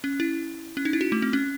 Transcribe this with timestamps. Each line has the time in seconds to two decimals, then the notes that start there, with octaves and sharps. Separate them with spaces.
0.04 C#4
0.20 E4
0.77 C#4
0.85 D#4
0.93 E4
1.01 F#4
1.12 A3
1.22 C4
1.33 C#4